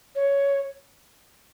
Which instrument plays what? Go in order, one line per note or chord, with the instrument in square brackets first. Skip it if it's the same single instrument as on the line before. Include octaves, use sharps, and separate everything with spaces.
[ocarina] C#5